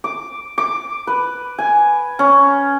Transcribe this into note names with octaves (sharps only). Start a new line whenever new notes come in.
D6
D6
B4
G#5
C#4